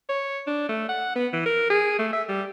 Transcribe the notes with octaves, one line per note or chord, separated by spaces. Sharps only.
C#5
D4
A3
F#5
B3
E3
A#4
G#4
A3
E5
G3